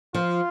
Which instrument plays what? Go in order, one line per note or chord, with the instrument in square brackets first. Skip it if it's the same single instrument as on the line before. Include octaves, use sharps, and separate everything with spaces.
[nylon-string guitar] F3 [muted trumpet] F4